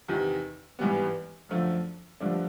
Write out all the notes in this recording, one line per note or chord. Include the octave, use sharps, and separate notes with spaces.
E2 C3 D#3
G#1 G2 E3 G3 B3
F#2 D3 F3 A3
G2 D3 F3 A3 D4